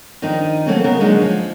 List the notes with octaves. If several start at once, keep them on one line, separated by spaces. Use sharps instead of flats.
D#3 F3 D4 D#4
F#3 A3 A#3 C4 C#4
C#3 B3 G#4 A#4
D3 F#3 G#3 A#3 C#4 D#4
F3